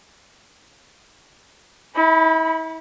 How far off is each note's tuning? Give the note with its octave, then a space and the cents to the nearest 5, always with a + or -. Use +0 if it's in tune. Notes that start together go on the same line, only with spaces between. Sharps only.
E4 -40 B5 +0